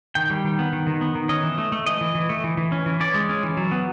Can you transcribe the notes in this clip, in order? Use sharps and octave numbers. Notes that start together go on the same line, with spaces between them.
D#3 G5
G3
D#3
B3
D#3
D#3
B3
D#3
C#4 D#5
E3
A3
A3
E3 D#5
E3
E3
A3
E3
E3
C#4
E3
C#4 D5
G#3
C#4
E3
F#3
B3